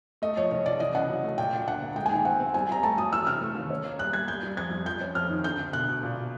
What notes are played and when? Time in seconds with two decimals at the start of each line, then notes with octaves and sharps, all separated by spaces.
0.22 A3 D#5
0.37 F3 C#5
0.51 C2 C#5
0.66 C2 D5
0.80 E3 D#5
0.94 C#3 F#5
1.09 F#3
1.24 A3
1.38 A#2 G5
1.53 A#2
1.67 D2 F#5
1.82 A#3
1.96 G#3 G5
2.06 G#5
2.11 D#3 G5
2.25 C4 F#5
2.40 C4
2.54 G3 G#5
2.69 G3 A#5
2.83 A3 A5
2.98 F#3 D#6
3.12 E3 E6
3.27 C3 F6
3.41 A3
3.55 D#2
3.70 C#4
3.85 A#3
3.99 G3 F#6
4.13 G3 G#6
4.28 G3 G6
4.43 G3
4.57 F2 G#6
4.71 G3
4.86 F3 G6
5.01 C#4
5.15 F2 F6
5.30 D#3
5.44 D3 G6
5.59 D2
5.73 B2 F#6
5.88 B2
6.03 A#2